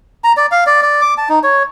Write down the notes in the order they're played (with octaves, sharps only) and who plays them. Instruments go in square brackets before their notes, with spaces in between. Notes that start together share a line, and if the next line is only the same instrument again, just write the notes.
[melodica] A#5
D5
F5
D5
D5
D6
A5
D#4
C#5